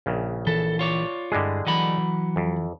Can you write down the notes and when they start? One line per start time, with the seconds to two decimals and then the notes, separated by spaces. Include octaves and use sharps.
0.06 A#1 C#3
0.47 E3 A4
0.79 F4 C#5 D5
1.32 G2 D3 G3 G#3 E4 G#4
1.67 E3 F#3 F#5 B5
2.36 F2